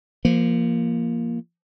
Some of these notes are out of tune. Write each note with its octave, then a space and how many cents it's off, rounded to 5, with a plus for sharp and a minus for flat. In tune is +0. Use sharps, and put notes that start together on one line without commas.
F3 -25 A#3 +0